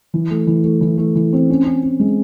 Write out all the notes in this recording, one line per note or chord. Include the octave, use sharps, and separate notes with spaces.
E3
A3
E3
A3
E3
A3
E3
C4
C#4
C#4
C#4
G#3